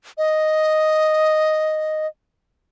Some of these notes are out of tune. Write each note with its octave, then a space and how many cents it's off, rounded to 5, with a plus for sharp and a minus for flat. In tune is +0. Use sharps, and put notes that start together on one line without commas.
D#5 +0